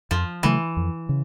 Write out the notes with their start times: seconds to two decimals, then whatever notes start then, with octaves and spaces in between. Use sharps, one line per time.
0.11 F2 F3
0.43 C#3 E3 F#3 A3
0.77 F2
1.09 C#3